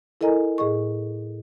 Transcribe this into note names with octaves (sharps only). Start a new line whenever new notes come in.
E4 A4 A#4 D#5 G#5 A#5
A2 G#4 D#5 C#6